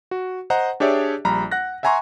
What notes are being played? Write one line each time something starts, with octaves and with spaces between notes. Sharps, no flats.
F#4
C5 D#5 F#5 A#5
D4 G4 G#4 C#5 D5 E5
A#1 G3 A#5 B5
F#5 F#6 A#6
E5 F#5 G#5 A#5 C6 C#6